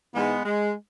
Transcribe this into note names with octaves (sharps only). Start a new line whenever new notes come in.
G#2 E3 G#3 B3
G#3